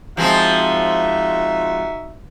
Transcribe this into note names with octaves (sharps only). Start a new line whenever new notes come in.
F3 G#3 C4 D#4 F#4 E5